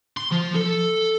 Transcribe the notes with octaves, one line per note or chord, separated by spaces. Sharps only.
C6
F3
A4